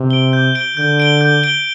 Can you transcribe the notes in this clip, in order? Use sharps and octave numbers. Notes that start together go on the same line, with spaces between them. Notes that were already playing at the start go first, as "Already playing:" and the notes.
Already playing: C3
D7 G7
G6
D7 G7
D3 G6
D7 G7
G6
D7 G7